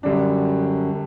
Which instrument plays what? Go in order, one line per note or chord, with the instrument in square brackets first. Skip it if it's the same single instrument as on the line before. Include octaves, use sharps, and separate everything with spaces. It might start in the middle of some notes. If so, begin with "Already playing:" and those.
[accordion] F#2 [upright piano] D3 G3 D4